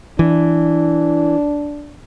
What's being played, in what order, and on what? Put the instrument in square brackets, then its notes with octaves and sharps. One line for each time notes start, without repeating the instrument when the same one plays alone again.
[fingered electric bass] E3 [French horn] D4